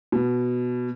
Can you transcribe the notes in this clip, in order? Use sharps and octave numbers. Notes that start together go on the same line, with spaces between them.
B2